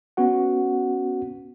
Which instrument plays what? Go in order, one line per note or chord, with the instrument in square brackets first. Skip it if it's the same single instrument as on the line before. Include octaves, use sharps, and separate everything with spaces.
[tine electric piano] B3 C#4 F#4 F#5